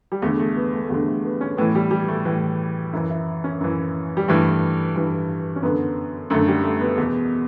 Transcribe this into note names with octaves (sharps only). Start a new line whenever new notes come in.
G3
E2 D3 A3
A3
B3
A3
A3
E2 D3 G3
A3
B3
C#4
A2 E3 B3
G3
G3
A3
A2 E3
F#2 E3 E4
E4
C#4
F#2 E3
G3
G2 E3 A3
G2 E3
C#4
F#2 D3 B3
F#2 D3 A3
G3
A3
B3
E2 B2